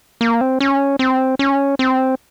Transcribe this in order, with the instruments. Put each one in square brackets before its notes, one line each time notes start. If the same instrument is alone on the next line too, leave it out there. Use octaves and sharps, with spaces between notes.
[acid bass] A#3
C4
C#4
C4
C#4
C4